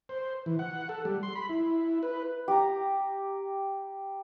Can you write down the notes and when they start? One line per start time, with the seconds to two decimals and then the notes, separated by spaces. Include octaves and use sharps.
0.09 C5
0.46 E3
0.59 F#5
0.89 A4
1.05 G3
1.23 C6
1.35 B5
1.49 E4
2.03 B4
2.48 G4 A#5